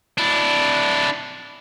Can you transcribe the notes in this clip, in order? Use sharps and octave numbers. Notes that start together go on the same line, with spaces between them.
D4 E4